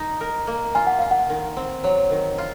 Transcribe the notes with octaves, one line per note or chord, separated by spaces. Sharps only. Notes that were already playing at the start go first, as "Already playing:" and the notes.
Already playing: D#4
A#4
A#3
F4 G#5
F#5
F4 F5
F#5
D#3
C4
F#3
D#3
F4